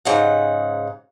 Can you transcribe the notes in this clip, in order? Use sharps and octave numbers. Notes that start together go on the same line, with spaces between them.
G#2 C#3 D#4 F#5